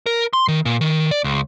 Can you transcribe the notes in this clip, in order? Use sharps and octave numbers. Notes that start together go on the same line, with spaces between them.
A#4
C6
D#3
A#2
D#3
D5
C#2